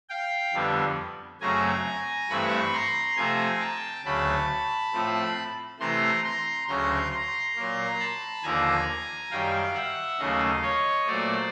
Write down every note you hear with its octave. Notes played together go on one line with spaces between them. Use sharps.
F5 G5
F2 D3 G3 B3
F#2 C#3 F#3 A3 C4 G#5 A#5
G2 E3 A3 C4 B5 C#6
A#5 C6
C3 F3 A3 C4 G#5 A#5
G5 A5
D2 C#3 F#3 A5 B5
A2 F3 A3 C4
C3 E3 A3 A#5 C6
A#5 C6
D2 C#3 F#3 A#5 C6
A#5 C6
A#2 F#3 A#3
A5 B5
D#2 D3 F3 A#3 G#5 A#5
F#2 D#3 G3 F5 G5
E5 F#5
D#2 C#3 F#3 A3 D#5 F5
C#5 D#5
A#2 F#3 A3 C5 D5